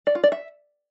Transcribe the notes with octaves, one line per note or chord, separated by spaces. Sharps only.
D5
F4
D5
E5